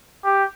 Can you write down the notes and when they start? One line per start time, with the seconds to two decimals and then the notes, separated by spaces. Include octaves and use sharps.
0.24 G4